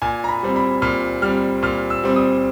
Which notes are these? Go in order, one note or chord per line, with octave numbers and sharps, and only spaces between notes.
A#2 G#5
A#5
B5
G3 C4
B5
A#2 F6
G3 C4 F6
A#2 F6
E6
G3 C4
D#6